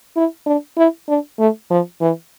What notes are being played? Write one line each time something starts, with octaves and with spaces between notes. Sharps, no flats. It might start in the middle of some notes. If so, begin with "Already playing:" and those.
E4
D4
E4
D4
A3
F3
E3